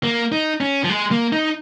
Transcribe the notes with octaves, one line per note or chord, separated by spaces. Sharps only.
A#3
D#4
C#4
F3
G#3
A#3
D#4